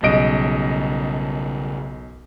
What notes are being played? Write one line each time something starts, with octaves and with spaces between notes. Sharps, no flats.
B1 C#3 G3 D#5 D7